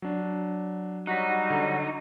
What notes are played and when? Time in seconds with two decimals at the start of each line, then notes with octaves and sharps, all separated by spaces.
0.02 F#3 D4
1.07 F#3 G3 D#4 F#4 F#6 B6
1.50 D3